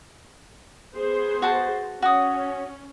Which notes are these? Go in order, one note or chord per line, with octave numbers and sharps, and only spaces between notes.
B3 G#4 C5
F#4 A5
C#4 F#4 D#6